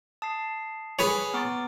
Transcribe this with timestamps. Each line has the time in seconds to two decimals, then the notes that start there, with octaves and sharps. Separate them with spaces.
0.22 A5 D#6 C7
0.99 G#4 B4 C#5 G#5
1.34 B3 A#5 C#6 D6 A6